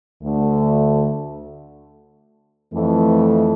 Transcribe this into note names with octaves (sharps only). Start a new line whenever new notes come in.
D2 D3 A3
F2 E3 A3